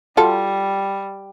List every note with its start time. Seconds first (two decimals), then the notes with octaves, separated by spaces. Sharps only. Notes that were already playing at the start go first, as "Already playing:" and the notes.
0.17 G3 F4 F#4 A4